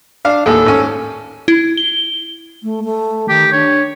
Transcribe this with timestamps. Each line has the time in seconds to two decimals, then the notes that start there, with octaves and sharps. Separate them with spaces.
0.25 D4 F5
0.46 D#2 A2 G#4 A4
0.66 G#2 C#4
1.48 E4
1.77 G7
2.63 A3
2.84 A3
3.29 D#3 G4
3.52 D4 C#5